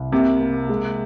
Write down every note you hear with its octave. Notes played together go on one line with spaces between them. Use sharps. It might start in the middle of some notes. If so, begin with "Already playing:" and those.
Already playing: C2
C3 A#3
A#3
G#3